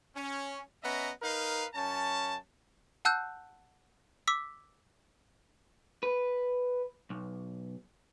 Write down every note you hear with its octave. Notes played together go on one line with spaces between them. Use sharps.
C#4
B3 C#4 D#5 E5 A#5
D#4 A#4 B4 D#5 F5
F#2 C#4 A5
F#5 A5 E6 F#6 G6
D6 E6 B6
B4
B1